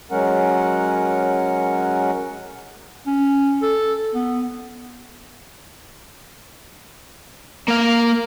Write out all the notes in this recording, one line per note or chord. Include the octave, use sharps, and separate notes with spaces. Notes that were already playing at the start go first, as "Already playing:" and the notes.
F#3 G#3 C#4 A#4 F#5
C#4
A4
B3
A#3 F5